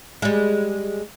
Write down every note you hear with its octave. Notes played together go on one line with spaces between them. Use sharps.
G3 G#3